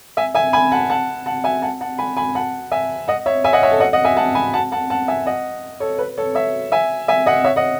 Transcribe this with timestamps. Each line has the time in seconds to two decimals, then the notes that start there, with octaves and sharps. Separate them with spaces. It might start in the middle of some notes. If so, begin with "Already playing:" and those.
0.17 E5 G#5
0.35 E5 G#5
0.53 G#5 B5
0.72 F#5 A5
0.90 F#5 A5
1.26 F#5 A5
1.44 E5 G#5
1.62 F#5 A5
1.81 F#5 A5
1.98 G#5 B5
2.17 G#5 B5
2.35 F#5 A5
2.72 E5 G#5
3.08 D#5 F#5
3.26 C#5 E5
3.44 E5 G#5
3.53 D#5 F#5
3.63 C#5 E5
3.71 A4
3.80 D#5 F#5
3.93 D#5 F#5
4.04 E5 G#5
4.17 F#5 A5
4.35 G#5 B5
4.53 F#5 A5
4.72 F#5 A5
4.90 F#5 A5
5.08 E5 G#5
5.26 D#5 F#5
5.80 A4 C#5
5.99 B4
6.18 A4 C#5
6.35 C#5 E5
6.72 E5 G#5
7.08 E5 G#5
7.26 D#5 F#5
7.44 C#5 E5
7.56 D#5 F#5